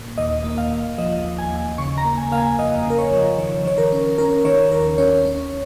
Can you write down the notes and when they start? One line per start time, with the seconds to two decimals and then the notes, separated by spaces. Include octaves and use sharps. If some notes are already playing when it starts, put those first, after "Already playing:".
Already playing: A#2
0.18 D#2 D#5
0.44 A#3
0.51 D#5
0.58 F5
0.71 D#2
0.98 F3 D#5
1.24 D#2
1.39 G#5
1.52 D#2
1.78 C#3 C#6
1.98 A#5
2.05 A#3
2.18 G#5
2.32 A#3 F5
2.38 G#5
2.58 F2 D#5
2.86 C#3 A#4
2.98 C#5
3.11 F3
3.38 D#3 C#5
3.65 D#3 C#5
3.78 A#4
3.92 C#4
4.18 C#4 A#4
4.45 D#3 C#5
4.71 D#2 A#4
4.98 C#4 C#5
5.25 C#4